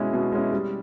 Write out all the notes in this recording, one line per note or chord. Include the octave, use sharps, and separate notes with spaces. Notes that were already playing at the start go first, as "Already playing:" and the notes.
Already playing: B2 G#3 C#4 E4
B2
G#3 C#4 E4
G3